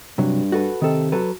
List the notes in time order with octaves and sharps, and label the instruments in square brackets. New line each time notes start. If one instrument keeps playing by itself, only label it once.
[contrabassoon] G2 [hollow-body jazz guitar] C3 F#3
[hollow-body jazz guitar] F#4 A4 B4
[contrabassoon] C3 [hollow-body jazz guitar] D#3 A4
[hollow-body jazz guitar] F#3 A4 B4